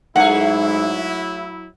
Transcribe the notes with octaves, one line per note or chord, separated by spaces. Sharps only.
G#2 F#3 A3 E4 G#4 F#5